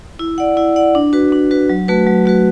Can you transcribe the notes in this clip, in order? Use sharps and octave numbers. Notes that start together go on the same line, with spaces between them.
E4
D5 F#5
E4
D5 F#5
D4
F#4 B4
D4
F#4 B4
F#3
A3 F#4 B4
F#3
A3 F#4 B4